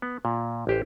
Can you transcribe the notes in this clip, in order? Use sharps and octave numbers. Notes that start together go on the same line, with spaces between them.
B3
A#2
A1 G4 C5